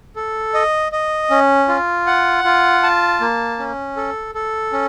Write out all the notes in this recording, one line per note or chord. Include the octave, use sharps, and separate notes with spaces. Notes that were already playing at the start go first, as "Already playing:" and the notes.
A4
D#5
D#5
C#4
F4
F#5
F4
A5
A#3
C#4
A4
A4
C#4